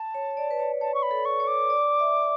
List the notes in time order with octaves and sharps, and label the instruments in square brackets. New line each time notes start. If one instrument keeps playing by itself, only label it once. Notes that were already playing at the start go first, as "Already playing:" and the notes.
Already playing: [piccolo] A5
[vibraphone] C#5
D5
B4
C#5
[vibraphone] C#5 [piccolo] A5
[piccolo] C#6
B5
[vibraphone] A4
[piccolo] C#6
[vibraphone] C#5
[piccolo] D6
[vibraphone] D5
E5